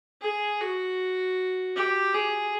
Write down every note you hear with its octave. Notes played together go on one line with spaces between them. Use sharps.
G#4
F#4
G4
G#4